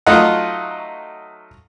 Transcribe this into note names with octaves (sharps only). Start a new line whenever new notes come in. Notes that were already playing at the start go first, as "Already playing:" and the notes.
F#3 A3 D#4 F4 D#5 F#5